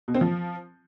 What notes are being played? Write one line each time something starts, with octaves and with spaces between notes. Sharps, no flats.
B2
C4
F3